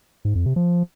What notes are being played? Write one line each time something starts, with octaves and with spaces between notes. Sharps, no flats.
G#2
F2
C3
F3